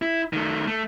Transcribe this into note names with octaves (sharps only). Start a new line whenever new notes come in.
E4
D#3 A3
A3